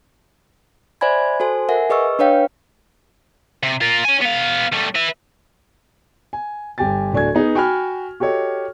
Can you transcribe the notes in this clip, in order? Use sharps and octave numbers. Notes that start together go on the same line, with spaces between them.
C5 D5 E5 G#5 B5 G#6
F#4 A4 C5 G#5
A#4 E5 F#5 G#5
G#4 B4 D#5 C#6 E6
D4 B4 C#5 F5 G5
C3
F4 A#4
C#5 G#5
B3 F5
G3 A3
B4 E5
G#5
G1 G2 G4 G5 G#5 A6
D1 A3 D4 F#4 G#5 G#6
B3 D#4 G#4
F#4 G5 G#5 B5 F6
F#4 G4 A4 C#5 D#5